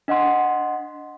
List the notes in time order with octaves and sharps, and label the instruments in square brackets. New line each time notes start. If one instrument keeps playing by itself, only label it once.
[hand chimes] D4 D#5 F#5 C6